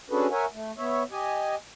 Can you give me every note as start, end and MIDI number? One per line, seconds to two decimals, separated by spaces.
0.10 0.27 61
0.10 0.27 62
0.10 0.27 66
0.10 0.27 68
0.10 0.27 69
0.10 0.27 71
0.31 0.46 70
0.31 0.46 73
0.31 0.46 76
0.31 0.46 78
0.31 0.46 80
0.53 0.72 57
0.78 1.03 59
0.78 1.03 73
0.78 1.03 76
1.11 1.55 67
1.11 1.55 75
1.11 1.55 80